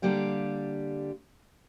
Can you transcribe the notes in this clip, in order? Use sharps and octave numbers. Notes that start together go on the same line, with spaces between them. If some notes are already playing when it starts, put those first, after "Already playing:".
D3 G3 A#3 G4 F5